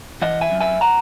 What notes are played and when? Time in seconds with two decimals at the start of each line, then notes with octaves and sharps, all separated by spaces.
0.22 E3 D#5 F#5
0.41 E5 G#5
0.51 F#2
0.61 E5 G#5
0.81 F#5 A#5